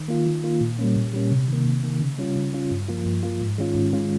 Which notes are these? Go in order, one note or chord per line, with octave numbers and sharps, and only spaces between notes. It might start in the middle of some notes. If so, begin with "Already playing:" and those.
Already playing: D#3
A#3 F4
D#3
A#3 F4
A#2
G3 A#3 C#4
A#2
G3 A#3 C#4
C3
D#3 A#3
C3
D#3 A#3
C#3
G3 C#4 F4
C#3
G3 C#4 F4
G2
F3 A#3 F4
G2
F3 A#3 F4
G#2
D#3 G#3 C#4 F4
G#2
D#3 G#3 C#4 F4